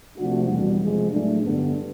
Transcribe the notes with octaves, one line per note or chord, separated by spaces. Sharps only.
C3 F3 A3 D4 F#4
E2 B2 G3
C3 F3 G#3
A2 F#3 A3 D4
G2 D3 G3 B3 D4